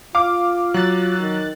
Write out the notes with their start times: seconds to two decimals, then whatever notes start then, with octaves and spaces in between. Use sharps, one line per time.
0.15 F4 F5 D6
0.74 F#3 F#6 A6
1.19 D#3